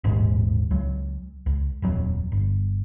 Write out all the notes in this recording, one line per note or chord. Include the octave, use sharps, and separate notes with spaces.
D#1 A1 D#2 G#2
C#2 F#3
C#2
D#1 F2 F#3
G1